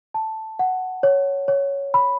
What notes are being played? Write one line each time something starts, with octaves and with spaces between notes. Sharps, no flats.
A5
F#5
C#5
C#5
B5